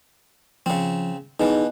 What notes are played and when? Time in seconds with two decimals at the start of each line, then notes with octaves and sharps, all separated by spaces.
0.66 C#3 F3 C4
1.40 B2 E3 D#4 G#4